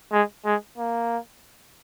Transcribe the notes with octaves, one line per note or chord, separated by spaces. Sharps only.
G#3
G#3
A#3